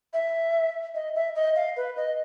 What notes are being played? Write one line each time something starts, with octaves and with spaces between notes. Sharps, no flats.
E5
D#5
E5
D#5
F5
B4
D#5